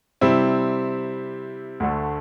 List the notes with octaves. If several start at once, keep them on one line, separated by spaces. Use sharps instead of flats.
C3 G3 C4 E4
D2 D3 A3